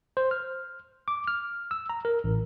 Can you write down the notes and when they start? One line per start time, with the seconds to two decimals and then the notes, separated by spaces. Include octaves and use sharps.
0.17 C5
0.31 F6
1.08 D6
1.28 F6
1.71 E6
1.89 A#5
2.05 A#4
2.24 A1